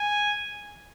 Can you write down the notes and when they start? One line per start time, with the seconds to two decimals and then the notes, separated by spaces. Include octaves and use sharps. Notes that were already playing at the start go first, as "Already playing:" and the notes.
Already playing: G#5